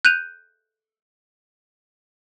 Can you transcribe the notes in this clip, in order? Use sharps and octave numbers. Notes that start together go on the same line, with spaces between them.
F#6 G6 D#7 F7